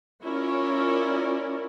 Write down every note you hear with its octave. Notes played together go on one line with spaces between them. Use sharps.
C#4 E4 F4 A#4 C#5 D5